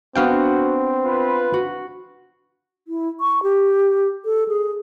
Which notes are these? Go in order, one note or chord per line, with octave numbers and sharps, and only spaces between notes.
B3 C4 D4 F#4 F5 G5
F4 B4
F#4
E4
C#6
G4
A4
G#4